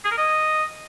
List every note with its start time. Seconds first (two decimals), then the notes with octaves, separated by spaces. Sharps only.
0.04 G#4
0.11 A#4
0.17 D#5